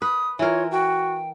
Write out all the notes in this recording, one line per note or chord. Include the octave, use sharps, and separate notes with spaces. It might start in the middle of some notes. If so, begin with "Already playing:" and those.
B4 D#6
E3 F4 A#4 C#5
F#4 G5